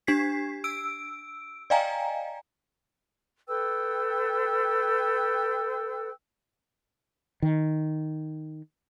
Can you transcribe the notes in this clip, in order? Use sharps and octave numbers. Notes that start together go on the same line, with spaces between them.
D4 G4 G#6 B6 C7
E6 D7
D5 D#5 F5 G5 G#5 A#5
A4 B4 G5 E6
D#3